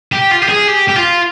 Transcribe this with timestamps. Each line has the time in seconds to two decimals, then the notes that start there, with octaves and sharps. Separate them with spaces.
0.13 G4
0.31 F4
0.42 G4
0.49 G#4
0.68 G4
0.88 G4
0.96 F4